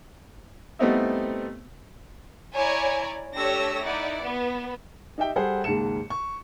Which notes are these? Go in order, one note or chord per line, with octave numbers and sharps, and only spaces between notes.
G3 A3 B3 C4 D#4 E4
E4 C#5 D5 G#5 A#5
A3 D4 G4 C#5 E6 A#6
D#4 E4 D5 F#5
B3
D#4 G4 E5 G5
G3 G#4 A4 C5 F#5
D#2 G#2 C#3 A5 C#7 E7
C#6